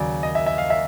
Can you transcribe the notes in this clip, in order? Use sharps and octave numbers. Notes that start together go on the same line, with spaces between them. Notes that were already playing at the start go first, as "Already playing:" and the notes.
Already playing: D#2 C#3 F#3 D5
D#5
E5
E5
F5
E5